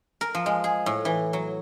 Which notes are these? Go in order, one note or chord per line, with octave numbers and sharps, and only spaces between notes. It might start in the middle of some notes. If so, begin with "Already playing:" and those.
A#4
F3
G#3
G#4
A2
E3
F#3